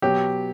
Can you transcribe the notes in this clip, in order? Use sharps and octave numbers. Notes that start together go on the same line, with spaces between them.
B2 F#3 G4